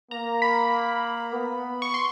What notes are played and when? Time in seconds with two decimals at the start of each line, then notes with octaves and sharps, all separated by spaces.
0.11 A#3 A#5
0.42 B5
1.33 B3
1.82 C#6
1.94 C6